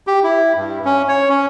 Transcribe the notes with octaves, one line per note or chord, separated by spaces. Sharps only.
G4
E4
G2
C#4
C#5
C#4